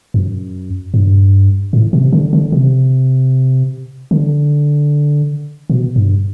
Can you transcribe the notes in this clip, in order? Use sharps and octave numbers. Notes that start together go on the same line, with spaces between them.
F#2
G2
A2
C3
D3
D3
C3
D3
B2
G2